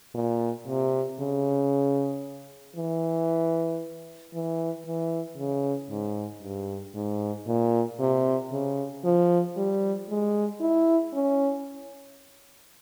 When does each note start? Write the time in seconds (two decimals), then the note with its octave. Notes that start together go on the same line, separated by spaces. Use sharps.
0.15 A#2
0.68 C3
1.20 C#3
2.76 E3
4.34 E3
4.86 E3
5.38 C#3
5.91 G#2
6.43 G2
6.95 G#2
7.47 A#2
8.00 C3
8.52 C#3
9.04 F3
9.57 G3
10.09 G#3
10.61 E4
11.14 C#4